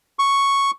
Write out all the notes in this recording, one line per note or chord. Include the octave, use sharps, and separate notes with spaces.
C#6